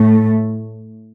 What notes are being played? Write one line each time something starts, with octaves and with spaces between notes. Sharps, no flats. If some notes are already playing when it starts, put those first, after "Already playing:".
Already playing: A2 A3